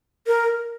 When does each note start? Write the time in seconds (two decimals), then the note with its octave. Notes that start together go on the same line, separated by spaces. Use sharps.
0.27 A#4